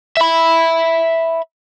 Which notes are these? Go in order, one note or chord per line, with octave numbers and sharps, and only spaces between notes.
E5 B5